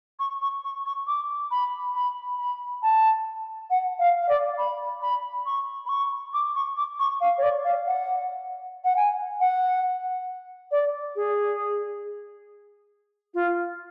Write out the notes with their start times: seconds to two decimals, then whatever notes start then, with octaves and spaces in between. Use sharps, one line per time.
0.20 C#6
0.42 C#6
0.64 C#6
0.86 C#6
1.07 D6
1.51 B5
1.95 B5
2.39 B5
2.83 A5
3.70 F#5
3.99 F5
4.22 F5
4.29 D5
4.58 B5
5.02 B5
5.46 C#6
5.86 B5
5.89 C#6
6.34 D6
6.55 C#6
6.77 D6
7.00 C#6
7.21 F5
7.38 C#5
7.43 D5
7.64 F5
7.87 F#5
8.84 F#5
8.96 G#5
9.40 F#5
10.71 D5
11.16 G#4
13.34 F4